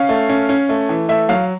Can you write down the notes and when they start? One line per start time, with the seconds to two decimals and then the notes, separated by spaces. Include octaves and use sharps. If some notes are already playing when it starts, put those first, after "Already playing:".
Already playing: C#4 F5
0.09 A3
0.29 C#4
0.49 C#4
0.69 A3
0.89 E3
1.09 A3 E5
1.29 F#3 F5